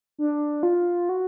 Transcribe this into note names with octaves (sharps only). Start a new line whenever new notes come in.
D4
F4
F#4